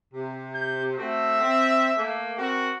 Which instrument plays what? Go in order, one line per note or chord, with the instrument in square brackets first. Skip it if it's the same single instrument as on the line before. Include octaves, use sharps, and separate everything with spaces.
[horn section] C3
[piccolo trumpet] G6
[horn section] A3 C4 F#4 [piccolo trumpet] E5
[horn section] C4
A3 A#3
[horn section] C4 A#4 [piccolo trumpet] F#4